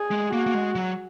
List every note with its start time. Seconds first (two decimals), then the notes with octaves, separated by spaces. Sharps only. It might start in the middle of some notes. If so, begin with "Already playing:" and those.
Already playing: G#4
0.11 G#3
0.33 A#3 F#4
0.46 A#3
0.54 G#3
0.75 F#3